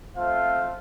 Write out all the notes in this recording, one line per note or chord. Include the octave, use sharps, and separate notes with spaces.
A3 C4 F4 C5 F5